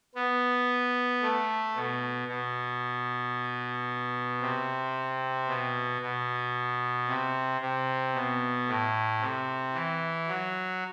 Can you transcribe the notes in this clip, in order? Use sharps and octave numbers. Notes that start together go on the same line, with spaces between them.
B3
A3
B2
B2
C3
B2
B2
C3
C3
B2
A2
C3
E3
F#3